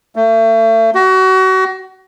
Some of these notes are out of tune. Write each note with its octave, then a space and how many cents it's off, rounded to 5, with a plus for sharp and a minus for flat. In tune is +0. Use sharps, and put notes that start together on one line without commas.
A3 +35
F#4 +30